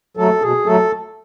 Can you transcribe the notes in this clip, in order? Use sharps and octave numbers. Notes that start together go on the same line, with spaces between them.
F#3 A3 A4
B2 G#4
F#3 A3 A4